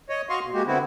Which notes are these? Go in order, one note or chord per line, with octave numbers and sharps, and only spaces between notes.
C#5 D#5
F#4 D#5 F5 C6 C#6
B2
G#3 A#3 F#4 G4
D3 B3 C4 E4 F#4